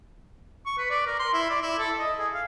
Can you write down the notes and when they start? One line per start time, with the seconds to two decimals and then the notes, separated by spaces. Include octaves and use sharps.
0.66 C#6
0.78 B4
0.90 D5
1.07 A#4
1.19 C6
1.34 E4
1.50 D5
1.62 E4
1.79 A4
2.00 D#5
2.19 G#4
2.34 F5